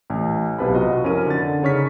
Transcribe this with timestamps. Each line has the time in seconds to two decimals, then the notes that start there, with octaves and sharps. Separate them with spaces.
0.10 A1 G#5
0.58 B1 C3 B4 A5 B5
0.75 F4 F#4 D#5
1.04 F2 C#4 E4 A#4 D#7
1.27 D3 A6
1.63 C#3 D#4 C#5 C#6 F6 B6